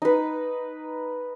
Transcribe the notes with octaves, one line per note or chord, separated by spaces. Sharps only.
D#4 B4